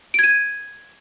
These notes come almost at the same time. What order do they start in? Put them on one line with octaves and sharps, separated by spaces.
D7 G#6 D#7